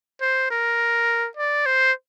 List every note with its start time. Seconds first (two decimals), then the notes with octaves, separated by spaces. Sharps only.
0.21 C5
0.50 A#4
1.37 D5
1.66 C5